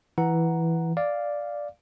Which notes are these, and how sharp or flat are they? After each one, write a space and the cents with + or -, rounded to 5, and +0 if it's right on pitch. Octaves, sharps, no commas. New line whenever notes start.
E3 +0 F#5 +0 A#5 +0
D5 +0 F5 +0